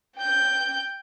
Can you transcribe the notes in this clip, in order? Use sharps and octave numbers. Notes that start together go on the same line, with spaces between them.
G5 G6